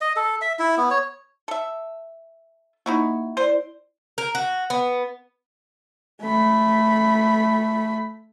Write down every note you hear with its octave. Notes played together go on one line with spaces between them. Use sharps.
D#5
A4
E5
E4
B3
C#5
A4 E5
A#3 D#4 E4 F#4
E4 C5 D5
A#4
F#4
B3
A3 B5